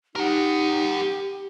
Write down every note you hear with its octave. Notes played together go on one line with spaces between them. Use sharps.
D#4 G4 A#4 F#5